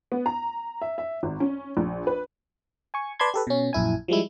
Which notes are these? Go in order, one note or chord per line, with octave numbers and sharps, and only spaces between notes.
B3
A#5
E5
E5
G#1
C#4
A#1
B4
G#5 C#6
B4 D5 A5 B5 C6 G#6
G4 A4 B4
B2 C#4
A#1 F#2 E4 G#5
F3 G3 G#3 E4